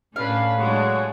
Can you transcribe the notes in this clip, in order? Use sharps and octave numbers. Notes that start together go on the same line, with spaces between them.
A2 C#4 D4 B4 F5
F#3 G#3 D4 F#5 C#6